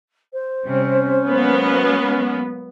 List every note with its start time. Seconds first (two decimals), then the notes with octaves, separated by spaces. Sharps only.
0.33 C5
0.65 C3 G3 C#4
1.27 F#3 G#3 A#3 B3